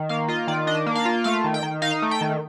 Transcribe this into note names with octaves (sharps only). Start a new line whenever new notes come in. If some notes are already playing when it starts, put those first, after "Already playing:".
Already playing: D#3
A#3 F5
F4 D#5
D#3 D5
D4 D#5
A#3
F5
F4
A3 F5
D#3
G5
D#3
D#4 F5
A3
G5
D#3